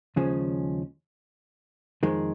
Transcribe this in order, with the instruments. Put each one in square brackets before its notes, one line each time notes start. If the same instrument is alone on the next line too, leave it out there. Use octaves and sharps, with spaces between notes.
[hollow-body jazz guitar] D#2 C#3 F3 G#3 C#4
F2 D#3 G#3